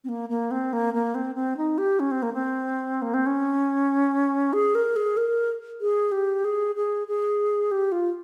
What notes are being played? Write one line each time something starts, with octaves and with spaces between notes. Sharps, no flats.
C4
A#3
A#3
C4
A#3
A#3
C4
C4
D#4
G4
C#4
C4
A#3
C4
A#3
C4
C#4
G#4
A#4
G#4
A#4
G#4
G4
G#4
G#4
G#4
G4
F4